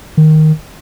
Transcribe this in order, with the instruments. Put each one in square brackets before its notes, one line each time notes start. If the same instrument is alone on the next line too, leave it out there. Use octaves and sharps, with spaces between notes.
[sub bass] D#3